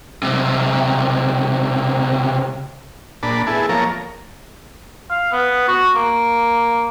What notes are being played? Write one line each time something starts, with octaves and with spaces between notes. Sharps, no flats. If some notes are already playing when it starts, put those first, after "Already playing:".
B1 C3
A#2 D4 A5 B5
B3 E4 G#4 A4
F3 A#3 A4 A#4 C#5
F5
B3
F#4
A#3